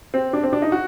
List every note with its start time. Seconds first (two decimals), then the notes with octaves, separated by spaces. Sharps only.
0.14 C4
0.33 D4
0.43 C4
0.53 D4
0.62 D#4
0.72 F#4